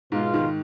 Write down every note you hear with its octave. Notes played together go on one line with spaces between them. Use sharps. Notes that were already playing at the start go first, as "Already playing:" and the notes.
G#2 B2 G#3 B3 F4
D#3